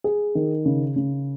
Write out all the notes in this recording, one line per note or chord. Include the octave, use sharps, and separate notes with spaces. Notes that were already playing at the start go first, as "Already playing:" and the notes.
G#4
D#3
C#3
C#3